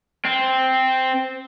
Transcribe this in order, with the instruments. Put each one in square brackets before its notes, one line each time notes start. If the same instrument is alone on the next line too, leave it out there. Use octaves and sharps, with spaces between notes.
[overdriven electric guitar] C4